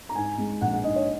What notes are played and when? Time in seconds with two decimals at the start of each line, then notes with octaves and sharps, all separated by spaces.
0.09 A#5
0.15 G#2 G#5
0.38 G#3
0.61 A#1 F#5
0.72 F#5
0.84 G#2 D#5
0.96 C#5